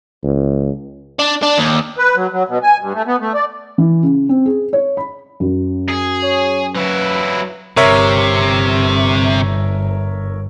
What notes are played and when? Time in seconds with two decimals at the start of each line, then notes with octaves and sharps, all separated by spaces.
0.24 C#2
1.19 D4
1.43 D4
1.58 D#2
1.98 B4
2.16 F#3
2.32 F#3
2.48 B2
2.63 G#5
2.80 G2
2.95 A3
3.07 B3
3.21 A3
3.34 D5
3.78 E3
4.03 C#3
4.29 C4
4.46 G#4
4.73 C#5
4.97 B5
5.40 F#2
5.89 G#4
6.23 C#5
6.76 F#3 E4 B4
7.77 G1 C3 A#4 C#5 E5